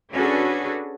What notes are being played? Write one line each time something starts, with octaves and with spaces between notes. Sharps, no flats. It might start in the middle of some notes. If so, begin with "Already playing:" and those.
C#4 D4 F#4 G#4 A4 B4